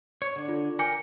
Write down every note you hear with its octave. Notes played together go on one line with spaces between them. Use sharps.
C#5
D3 D4
F4 A4
A#4 G5 G#5 D6 C#7